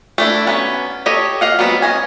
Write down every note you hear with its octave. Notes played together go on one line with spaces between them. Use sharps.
A3 D4 E4
F#3 B3 C#4
G4 A4 C#5 D#5
D#5 F5 F#5
F#3 G3 B3 C4
C#4 D#5 G#5